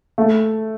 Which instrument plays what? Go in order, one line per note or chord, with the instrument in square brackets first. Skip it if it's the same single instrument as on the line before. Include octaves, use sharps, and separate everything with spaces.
[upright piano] A3